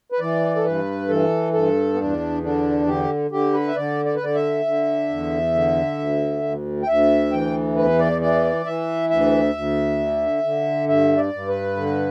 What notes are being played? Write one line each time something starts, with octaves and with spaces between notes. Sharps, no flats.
B4
E3 D5
A4
G2 B4
E3 A4
G2 A4
B3
E2 D4
D3 D4
D3 G4
D3 G4
B4
E5
D3 D5
D5
B4
D3 D5
E5
D3
E2
D3
D2
D2
G5
D2 E5
E3 G5
E2 B4
D5
E3 D5
E3 E5
D2 E5
D2
D3
D3
G2 E5
D5
G2
B4
D3